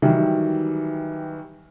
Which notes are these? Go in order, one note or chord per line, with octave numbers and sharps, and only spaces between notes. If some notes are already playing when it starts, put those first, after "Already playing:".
D#3 E3 F#3 G3